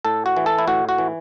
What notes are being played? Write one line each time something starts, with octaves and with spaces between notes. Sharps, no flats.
A2 A4
F#4
E3
A4
E4
A2 F#4
F#4
E3